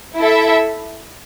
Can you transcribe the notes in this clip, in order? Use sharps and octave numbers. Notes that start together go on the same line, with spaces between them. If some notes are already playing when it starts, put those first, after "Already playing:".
E4 A4 E5